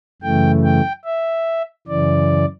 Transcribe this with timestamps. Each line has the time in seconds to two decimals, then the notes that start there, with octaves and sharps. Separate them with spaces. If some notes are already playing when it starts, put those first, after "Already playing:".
0.22 F#2 C#3 E3 A3 G5
0.64 G5
1.05 E5
1.87 F#2 C#3 E3 D5